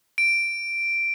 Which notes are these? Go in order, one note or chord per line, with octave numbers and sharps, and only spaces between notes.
D7